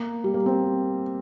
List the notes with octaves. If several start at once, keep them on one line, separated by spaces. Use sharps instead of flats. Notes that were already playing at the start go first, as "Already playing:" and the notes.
Already playing: A#3
G3
A#3
C4